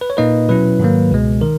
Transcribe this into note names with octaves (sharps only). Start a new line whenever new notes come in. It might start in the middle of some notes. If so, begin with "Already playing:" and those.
B4
C#5
A#2 A#3 D#4 B4 D#5
B2 F#3 C#4 E4 B4
G#2 D#3 F#3 A#3
C#2 B2 G#3
D#3 A#4